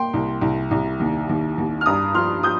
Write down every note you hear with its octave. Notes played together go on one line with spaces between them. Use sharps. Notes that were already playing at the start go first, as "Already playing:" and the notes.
Already playing: A#3 G5 C6
C2
C2
C2
D#2
D#2
D#2
F6
G2 A#5 D#6
F3 C6 F6
F3 D#6 G6